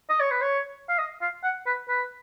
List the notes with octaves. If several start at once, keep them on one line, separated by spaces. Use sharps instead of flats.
D#5
C#5
B4
C#5
F5
D#5
F5
F#5
B4
B4